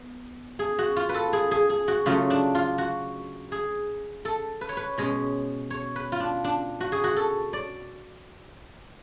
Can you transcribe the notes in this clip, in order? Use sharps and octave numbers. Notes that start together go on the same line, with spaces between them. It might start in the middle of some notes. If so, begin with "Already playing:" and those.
Already playing: B3
G#4
F#4
F4
B4
A4
G#4
G#4
G#4
F#4
C#3 F#3 A3 F4
D4
F4
F#4
G#4
A4
B4
C#5
B4
B2 G#3 C#4 C#5
C#5
B4
F4
D4
D4
F#4
G#4
F#4
A4
D5